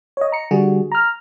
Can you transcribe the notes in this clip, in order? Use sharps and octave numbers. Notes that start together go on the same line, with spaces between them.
C#5 D#5
A#5 C#7
D3 G3 F#4 G#4
A#5 F6